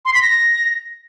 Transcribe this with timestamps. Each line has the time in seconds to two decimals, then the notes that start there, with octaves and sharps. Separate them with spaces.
0.05 C6
0.14 B6
0.22 A#6